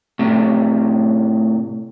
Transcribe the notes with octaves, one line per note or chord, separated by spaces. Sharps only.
A2 C3